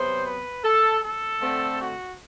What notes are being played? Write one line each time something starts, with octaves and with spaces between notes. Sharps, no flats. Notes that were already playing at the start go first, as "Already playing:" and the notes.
Already playing: C3 F#3 B3 C5
B4
A4
A4
D3 A3 C4
F#4